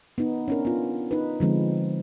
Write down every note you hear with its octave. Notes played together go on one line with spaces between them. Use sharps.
B3 D#4
C#4 D4 A#4
B3 F4
D#4 B4
D3 F3 G#3 C4